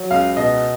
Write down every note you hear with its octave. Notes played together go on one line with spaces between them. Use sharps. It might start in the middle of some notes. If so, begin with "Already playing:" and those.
Already playing: F#3
C#2 F5
B2 D#5